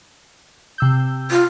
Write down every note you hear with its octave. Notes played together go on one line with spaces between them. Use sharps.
C3 E6 G6
F4